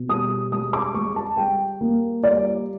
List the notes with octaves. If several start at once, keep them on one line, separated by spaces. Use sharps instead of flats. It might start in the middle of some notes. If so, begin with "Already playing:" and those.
Already playing: B2
G3 D#6
G#3 D#6
D6
G#3 C#6
A5
G3 G5
A#3
G3 D5